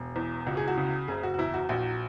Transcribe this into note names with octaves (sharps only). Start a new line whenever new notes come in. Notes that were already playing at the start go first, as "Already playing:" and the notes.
Already playing: E1
E2
C#2 F#4
G#4
F#4
C#3
F#1 G#4
F#4
F#4
E2 E4
F#4
A#1 F#4